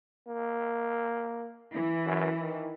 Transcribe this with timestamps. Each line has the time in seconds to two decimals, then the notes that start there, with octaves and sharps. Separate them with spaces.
0.27 A#3
1.73 E3
2.06 F#2
2.40 D#3